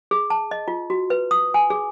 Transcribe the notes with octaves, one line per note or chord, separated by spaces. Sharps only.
G#4
A5
D#5
F4
F#4
B4
D#6
G#5
G#4